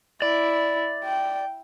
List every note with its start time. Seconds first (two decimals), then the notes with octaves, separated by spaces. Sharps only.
0.22 E4 D5
1.04 G5